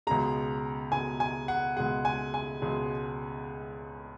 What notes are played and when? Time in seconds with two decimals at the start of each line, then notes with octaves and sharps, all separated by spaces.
0.07 C#2 B2 G#3 A#5
0.92 C#2 B2 G#3 G#5
1.20 G#5
1.48 F#5
1.76 C#2 B2 G#3 F#5
2.05 G#5
2.34 G#5
2.62 C#2 B2 G#3